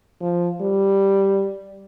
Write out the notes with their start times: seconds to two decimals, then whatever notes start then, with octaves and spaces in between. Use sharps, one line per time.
0.21 F3
0.61 G3